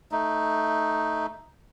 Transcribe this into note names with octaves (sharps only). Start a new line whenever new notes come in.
A3 D#4